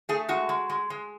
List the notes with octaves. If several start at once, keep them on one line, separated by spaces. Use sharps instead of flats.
A3 G#4
G#3 F#4
G#3
G#3
G#3